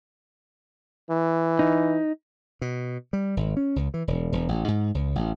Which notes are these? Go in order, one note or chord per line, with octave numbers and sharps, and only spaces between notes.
E3
D#4
B2
G3
G#1
C#4
C#2
E3
E1
E1
A1
G#2
C#2
A1